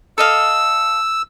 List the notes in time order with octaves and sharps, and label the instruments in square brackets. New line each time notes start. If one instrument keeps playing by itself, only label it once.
[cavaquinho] A4 D#5 F5 [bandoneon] E6